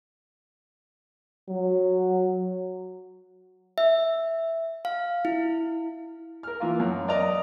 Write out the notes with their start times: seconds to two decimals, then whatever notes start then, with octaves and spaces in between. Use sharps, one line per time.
1.49 F#3
3.78 E5
4.85 F5
5.25 E4
6.43 A#4 F6
6.60 E3 A#3 F4
6.80 F#2
7.08 A#4 D5 D#5 A#5